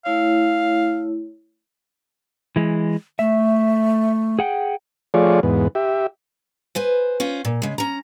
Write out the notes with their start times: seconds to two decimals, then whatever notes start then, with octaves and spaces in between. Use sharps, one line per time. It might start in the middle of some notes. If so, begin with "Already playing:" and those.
0.05 A3 E4 C#5 F5
2.56 E3 G#3
3.19 A3 E5
4.39 G#4 F#5 G5
5.14 F3 A3 F4 G#4 C#5 D5
5.43 E2 G#2 B3
5.75 G4 E5
6.75 B4 C5 G#5
7.20 C#4 F4 C5
7.45 A#2
7.62 C#3 G#3
7.78 C#4 A#5